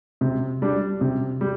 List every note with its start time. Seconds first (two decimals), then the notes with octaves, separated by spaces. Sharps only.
0.21 C3
0.62 G3 D4
1.01 C3
1.41 G3